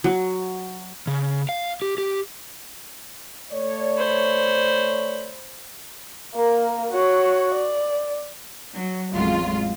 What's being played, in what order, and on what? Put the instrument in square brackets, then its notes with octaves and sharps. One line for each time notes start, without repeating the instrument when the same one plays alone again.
[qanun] F#3
[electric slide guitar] C#3
F5
G4
G4
[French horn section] A3 C#5 D5
[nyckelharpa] C5 B5
[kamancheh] A#3 A#4
F#4 C#5
D5
[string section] F#3
[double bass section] A1 F2 G#3 [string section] F#3 F4